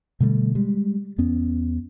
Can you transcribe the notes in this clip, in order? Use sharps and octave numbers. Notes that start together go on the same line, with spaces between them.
B2 D3 G3 A3
G3 G#3
E2 B3 C#4